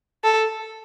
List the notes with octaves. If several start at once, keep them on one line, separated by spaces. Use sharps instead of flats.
A4